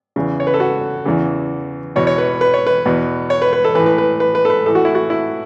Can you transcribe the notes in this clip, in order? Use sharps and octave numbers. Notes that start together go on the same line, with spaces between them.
E2 C#3 E3
C#5
B4
A4
F#4
E2 C#3 E3
E2 B2 C#5
C#5
B4
B4
C#5
B4
E2 B2
C#5
B4
B4
A4
E3 B4
A2
B4
B4
B4
B4
A4
B4
A2 E3 A4
F#4
E4
F#4
E4